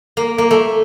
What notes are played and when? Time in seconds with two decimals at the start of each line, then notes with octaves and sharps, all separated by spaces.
0.17 A#3
0.38 A#3
0.51 A3